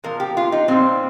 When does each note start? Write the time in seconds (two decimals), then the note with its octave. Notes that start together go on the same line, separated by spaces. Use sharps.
0.04 A#2 F3 A#4
0.20 G4
0.37 F4
0.52 D#4
0.68 A#2 G3 C4